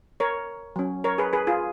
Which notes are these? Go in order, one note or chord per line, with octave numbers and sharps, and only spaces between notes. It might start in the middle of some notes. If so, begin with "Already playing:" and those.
A#4 C#5
F#3 C#4
A#4 C#5
G#4 B4
G#4 B4
F4 G#4